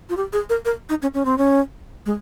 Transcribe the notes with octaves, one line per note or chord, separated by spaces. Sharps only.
F4
G4
G#4
A#4
A#4
D#4
C#4
C#4
C4
C#4
G#3